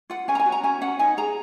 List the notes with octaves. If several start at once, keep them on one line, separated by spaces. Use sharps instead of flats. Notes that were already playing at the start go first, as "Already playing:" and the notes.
F4 F#5
C#4 G#5
A#5
G#5
F#4
A#5
C#4 G#5
C#4 F#5
D#4 G#5
G#4 A#5